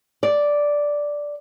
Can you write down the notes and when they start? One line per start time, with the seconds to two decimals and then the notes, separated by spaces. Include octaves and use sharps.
0.23 D5